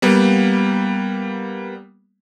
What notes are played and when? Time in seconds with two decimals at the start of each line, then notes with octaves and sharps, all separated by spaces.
0.02 G3 A#3 B3